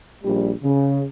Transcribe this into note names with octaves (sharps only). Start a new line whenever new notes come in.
A#1 G3
C#3